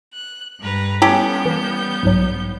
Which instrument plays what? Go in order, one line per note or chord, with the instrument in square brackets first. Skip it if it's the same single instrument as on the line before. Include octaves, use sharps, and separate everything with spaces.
[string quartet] F#6
G2 B4 A#5
[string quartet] G3 B3 G6 [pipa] C#4 G4 A4 [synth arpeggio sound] E4
[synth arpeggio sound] E3
B1 G#2 F#3